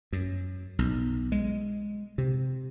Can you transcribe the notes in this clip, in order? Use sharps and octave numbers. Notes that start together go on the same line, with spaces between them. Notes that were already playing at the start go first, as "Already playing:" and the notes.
F#2
B1
G#3
C3